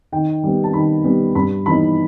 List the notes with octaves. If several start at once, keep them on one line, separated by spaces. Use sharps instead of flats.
D#3 G5
G3 B3
A5
D#3 B5
G3 B3
G2 B5
E3 B3 D#4 B5